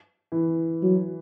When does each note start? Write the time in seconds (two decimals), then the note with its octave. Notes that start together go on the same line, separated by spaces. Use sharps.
0.32 E3
0.83 F#3